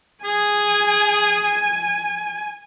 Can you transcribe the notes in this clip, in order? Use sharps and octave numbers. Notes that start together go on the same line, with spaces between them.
G#4 G#5